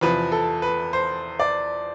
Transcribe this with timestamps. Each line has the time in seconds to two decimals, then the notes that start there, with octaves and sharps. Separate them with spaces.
0.01 E2 C3 F3 B4
0.32 A4
0.62 B4
0.93 C5
1.40 D5